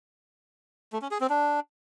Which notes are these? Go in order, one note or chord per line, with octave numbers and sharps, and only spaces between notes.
A3
C#4
G#4
C4
D4